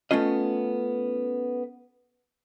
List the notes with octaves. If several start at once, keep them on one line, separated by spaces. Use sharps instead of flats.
A3 B3 C#4 F4 D#5